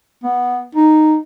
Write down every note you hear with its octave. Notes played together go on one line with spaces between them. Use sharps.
B3
D#4